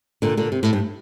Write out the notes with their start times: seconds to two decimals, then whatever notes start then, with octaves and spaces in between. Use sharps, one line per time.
0.22 A#2 D3
0.37 A#2 D3
0.52 C3
0.63 A2
0.73 G2